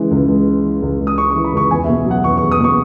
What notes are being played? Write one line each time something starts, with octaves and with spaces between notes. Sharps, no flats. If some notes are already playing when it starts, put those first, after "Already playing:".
Already playing: C#3 E3 G#3
C#2
G#3
C#3
E3
C#2
G#3
D#6
C#3 C#6
E3 C#6
B5
C#2 C#6
E2 G#5
E5
B2
F#3 F#5
E2 C#6
C#6
E2
D#6
B2 C#6